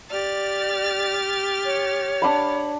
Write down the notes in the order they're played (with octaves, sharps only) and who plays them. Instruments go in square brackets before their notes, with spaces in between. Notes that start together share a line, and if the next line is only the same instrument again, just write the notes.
[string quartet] G4 F6 A6 [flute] D5
[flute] C#5
[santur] D4 F#5 B5